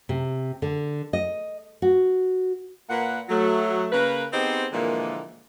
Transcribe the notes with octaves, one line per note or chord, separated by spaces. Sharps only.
C3
D3
D#5
F#4
A#2 A#3 B4 F#5
F#3 A3
C#3 A#3 A#4 B4
B3 C4 D#4 G4 G#4 C5
A#2 D3 E3 F3 G#3 A#3